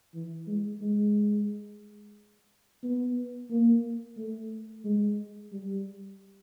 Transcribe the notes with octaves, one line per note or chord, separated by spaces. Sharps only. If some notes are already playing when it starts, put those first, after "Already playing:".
E3
G#3
G#3
B3
A#3
A3
G#3
G3